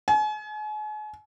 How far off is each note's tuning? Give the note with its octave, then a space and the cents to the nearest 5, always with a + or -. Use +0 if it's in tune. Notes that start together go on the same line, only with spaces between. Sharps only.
G#5 +40